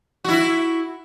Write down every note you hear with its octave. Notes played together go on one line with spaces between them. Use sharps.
E4 F#4